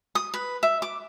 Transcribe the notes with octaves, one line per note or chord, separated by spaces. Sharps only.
D#6
B4
E5
D6